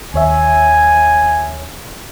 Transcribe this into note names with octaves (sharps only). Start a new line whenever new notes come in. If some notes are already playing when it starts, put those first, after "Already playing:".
D#2 C#5 E5 G#5